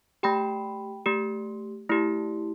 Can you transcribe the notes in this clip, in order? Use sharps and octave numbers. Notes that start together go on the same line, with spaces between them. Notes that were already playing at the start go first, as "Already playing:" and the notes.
A3 G4 G5 B5
A3 G4
A3 E4 G4